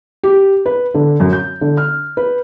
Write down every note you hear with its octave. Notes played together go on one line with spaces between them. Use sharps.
G4
B4
D3
F#2
G6
D3
F6
B4